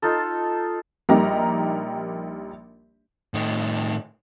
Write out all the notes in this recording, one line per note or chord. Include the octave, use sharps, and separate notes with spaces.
D#4 F4 A4
A#1 G3 D#4 G4 A#4 A#5
A2 D#3